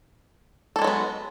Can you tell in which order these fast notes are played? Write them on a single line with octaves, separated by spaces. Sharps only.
A4 A#3 G#3 F#3 B3